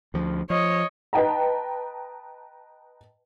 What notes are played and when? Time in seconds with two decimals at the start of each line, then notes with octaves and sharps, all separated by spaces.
0.14 D2 F3
0.50 F3 C#5 D#5
1.13 B4 D#5 G5 A5 A#5